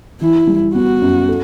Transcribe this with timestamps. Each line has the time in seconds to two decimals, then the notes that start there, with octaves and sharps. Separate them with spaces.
0.21 E3 E4
0.47 G3
0.74 B3 F#4
1.02 F#2
1.28 A4